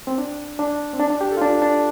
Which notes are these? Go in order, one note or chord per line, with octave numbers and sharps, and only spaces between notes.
C4
D4
D4
C4
D4
D4
G4
A4
F4
D4
D4